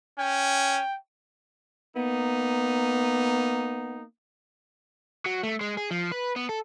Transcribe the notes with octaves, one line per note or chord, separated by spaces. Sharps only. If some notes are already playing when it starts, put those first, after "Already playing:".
C#4 G5
A#3 B3 D#4
F#3
A3
G#3
G#4
F3
B4
B3
A4